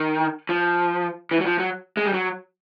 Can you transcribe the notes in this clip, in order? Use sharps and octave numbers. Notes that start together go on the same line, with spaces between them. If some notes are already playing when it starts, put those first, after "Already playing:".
Already playing: D#3
F3
E3
F#3
F3
F#3
G#3
G3
F#3